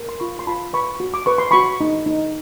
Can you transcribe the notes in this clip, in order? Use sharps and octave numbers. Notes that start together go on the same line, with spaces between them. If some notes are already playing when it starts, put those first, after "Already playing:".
Already playing: A#4
C6
F4 B5 C#6
C6
F4 A5 B5
B4 B5 C#6
F#4
D6
B4 C#6
C6
F#4 B5 C#6
D#4
D#4